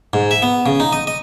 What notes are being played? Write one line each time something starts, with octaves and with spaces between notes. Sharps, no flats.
G#2
E5
B3
C#3
D#4
D#5
D#5